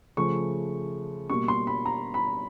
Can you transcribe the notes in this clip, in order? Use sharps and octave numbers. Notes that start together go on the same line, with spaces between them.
C#3 F3 A3 C#6
B2 G3 A#3 C#6
C6
B5
A#5
B5